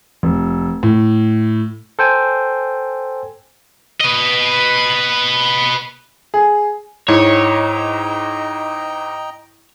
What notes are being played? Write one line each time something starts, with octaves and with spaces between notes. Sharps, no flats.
F1
A2
A4 C5 G5 G#5
B4 D#5
G#4
G#2 E4 C#5 D#5 G5 A#5